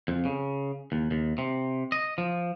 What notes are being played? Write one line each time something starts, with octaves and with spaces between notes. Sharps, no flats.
F2
C#3
D#2
D#2
C3
D#5
F3